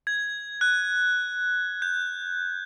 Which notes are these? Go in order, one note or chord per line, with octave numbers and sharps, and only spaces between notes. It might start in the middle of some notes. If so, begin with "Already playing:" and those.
G#6
F#6
G6